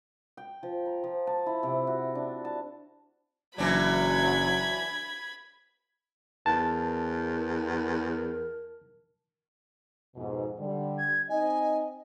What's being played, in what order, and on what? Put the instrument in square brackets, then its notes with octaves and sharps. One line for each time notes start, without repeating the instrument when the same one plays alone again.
[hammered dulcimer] G5
F3
A#5
F3
A5
E4
C3
F#4
D4
A5
[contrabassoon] F#1 [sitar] E3 C#4 D4 [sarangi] F#3 [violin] B5 G#6
[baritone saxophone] E2 [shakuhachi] A#4 [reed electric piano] A5
[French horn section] F2 G#2 B2
D3 G3
[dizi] G#6
[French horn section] C4 D#4 D#5 [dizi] G#5